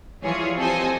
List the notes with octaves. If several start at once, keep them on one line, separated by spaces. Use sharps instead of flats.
E3 F3 G3 F4 G#4 C#5
C4 G4 A4 C5 D#5 G#5